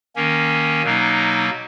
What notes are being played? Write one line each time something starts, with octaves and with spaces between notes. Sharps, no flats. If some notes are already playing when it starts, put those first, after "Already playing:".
D#3 A#3 C#4
B2 F#3 A#3 D#4